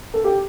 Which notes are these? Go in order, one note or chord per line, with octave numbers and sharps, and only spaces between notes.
A4
G4